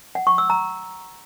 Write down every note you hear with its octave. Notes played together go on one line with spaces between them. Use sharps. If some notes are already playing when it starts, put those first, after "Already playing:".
F#5
C#6
E6
A#5